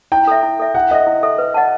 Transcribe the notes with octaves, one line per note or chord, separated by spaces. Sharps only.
E4 G5
A4 E5
E4
A4 E5
E4 F#5
A4 D#5 E5
E4
A4 E5
B4
D#5 F#5 A5